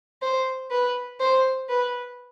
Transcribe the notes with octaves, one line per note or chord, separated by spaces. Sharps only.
C5
B4
C5
B4